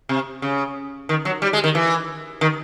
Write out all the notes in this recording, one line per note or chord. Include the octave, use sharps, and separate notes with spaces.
C3
C#3
D#3
F#3
G3
G#3
D#3
E3
D#3